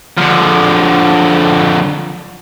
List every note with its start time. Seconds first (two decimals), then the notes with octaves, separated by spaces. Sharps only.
0.17 D3 F3